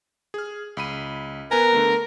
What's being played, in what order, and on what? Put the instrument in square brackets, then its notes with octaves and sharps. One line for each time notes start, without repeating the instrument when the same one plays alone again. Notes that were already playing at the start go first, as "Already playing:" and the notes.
[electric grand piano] G#4 F6
C#2 B5 D#7
[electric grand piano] B3 B4 G#5 [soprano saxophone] A#4
[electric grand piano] D3 A3 B3